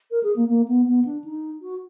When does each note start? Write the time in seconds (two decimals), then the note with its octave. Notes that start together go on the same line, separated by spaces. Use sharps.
0.11 A#4
0.23 G#4
0.36 A#3
0.48 A#3
0.68 B3
0.87 B3
1.05 D4
1.24 D#4
1.62 F#4